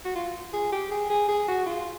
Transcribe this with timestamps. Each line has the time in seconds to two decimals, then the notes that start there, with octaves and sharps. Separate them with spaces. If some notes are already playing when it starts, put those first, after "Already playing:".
0.05 F#4
0.15 F4
0.53 G#4
0.72 G4
0.91 G#4
1.10 G#4
1.28 G#4
1.48 F#4
1.66 F4